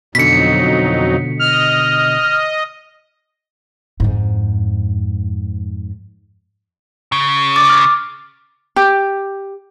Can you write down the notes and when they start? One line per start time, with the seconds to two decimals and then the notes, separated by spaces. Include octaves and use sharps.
0.15 F2 B2 D3 F#3 D#4 B6 C#7
1.39 D#5 F6
4.00 F2 G#2
7.12 C#3
7.56 D6 A6
7.69 F6
8.76 G4